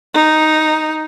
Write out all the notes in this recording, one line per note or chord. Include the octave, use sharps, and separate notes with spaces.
D#4